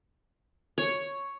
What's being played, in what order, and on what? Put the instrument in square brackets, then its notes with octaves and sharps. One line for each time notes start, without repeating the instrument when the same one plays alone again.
[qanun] C#5